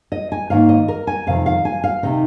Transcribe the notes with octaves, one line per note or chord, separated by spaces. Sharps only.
D#5
G#5
G#2 D#3 A#3 F5
D#5
A#4
G#5
F2 C3 D#3 F5
F5
G#5
F5
C3 D#3 D#4